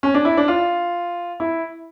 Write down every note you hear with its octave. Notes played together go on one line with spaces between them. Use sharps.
C#4
D4
E4
D4
F4
E4